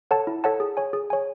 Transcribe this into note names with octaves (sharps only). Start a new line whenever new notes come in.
A4 C#5 F#5 A5
E4
A4 C#5 F#5 A5
G#4
C#5 G#5
G#4
C#5 G#5